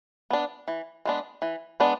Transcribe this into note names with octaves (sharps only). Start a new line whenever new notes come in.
B3 D4
E3
G#3 B3 D4
E3
G#3 B3 D4